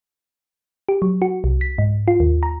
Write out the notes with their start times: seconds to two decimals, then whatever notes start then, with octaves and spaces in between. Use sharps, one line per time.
0.89 G4
1.02 F#3
1.22 F#4
1.44 C2
1.61 B6
1.78 G#2
2.08 F4
2.20 D#2
2.43 A#5